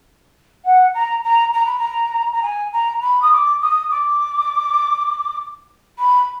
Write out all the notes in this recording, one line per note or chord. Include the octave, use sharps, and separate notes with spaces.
F#5
A#5
A#5
A#5
B5
A#5
A#5
G#5
A#5
B5
D#6
D6
D#6
D6
B5